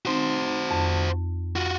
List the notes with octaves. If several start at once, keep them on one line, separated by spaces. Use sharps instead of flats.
C4 D#4 F#4 C5
F2
F4 F#4